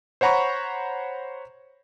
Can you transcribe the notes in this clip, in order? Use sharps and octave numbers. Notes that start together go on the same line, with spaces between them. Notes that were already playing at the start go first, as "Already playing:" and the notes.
C5 C#5 F#5 A#5 B5 C#6